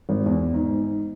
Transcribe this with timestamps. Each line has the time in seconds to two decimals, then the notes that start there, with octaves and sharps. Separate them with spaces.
0.09 G#1
0.26 E2
0.54 G#2